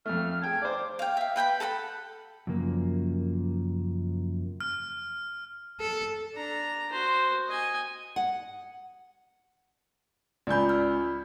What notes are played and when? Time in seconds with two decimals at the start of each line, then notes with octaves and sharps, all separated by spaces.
0.06 F2 A3 F6
0.42 G#4 G5 A5 G#6
0.62 C5 D5 D6
0.99 F5 G5
1.17 E5 F5
1.36 B4 G5 G#5 B5
1.60 A4 F#5 A#5 B5
2.47 F#2 C#3 F3 A#3
4.60 F6
5.80 A4
6.34 D4 A#5
6.92 F#4 C5
7.48 D#5 G#5
8.16 F#5
10.47 C#2 D5 G#5 B5 G6
10.69 B5 E6 F6